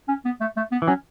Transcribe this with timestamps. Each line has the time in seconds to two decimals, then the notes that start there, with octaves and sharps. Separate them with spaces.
0.08 C#4
0.25 B3
0.41 A3
0.57 A3
0.72 B3
0.82 E3
0.88 F#3 C#4